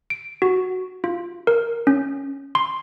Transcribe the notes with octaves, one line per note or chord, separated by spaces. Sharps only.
D7
F#4
F4
A#4
C#4
C6